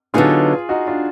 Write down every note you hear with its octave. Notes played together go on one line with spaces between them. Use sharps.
D3 F#3 B3 D#4 F4 G#4
D#4 F#4
D4 F4